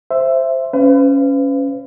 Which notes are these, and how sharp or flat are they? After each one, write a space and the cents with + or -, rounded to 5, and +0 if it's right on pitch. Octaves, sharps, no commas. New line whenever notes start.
C5 +0 E5 +10
C#4 +0 B4 +40 F5 -20